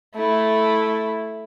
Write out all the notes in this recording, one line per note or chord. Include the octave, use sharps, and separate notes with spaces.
A3 E4